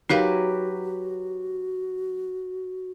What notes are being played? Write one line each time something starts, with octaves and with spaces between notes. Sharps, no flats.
F#3 D#4 F#4 G4 A#4 B4 F5